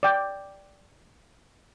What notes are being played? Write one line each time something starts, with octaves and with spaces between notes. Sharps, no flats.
D5 G5